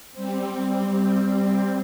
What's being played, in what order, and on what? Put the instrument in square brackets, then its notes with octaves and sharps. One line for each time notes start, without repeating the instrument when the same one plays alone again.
[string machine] G3 C4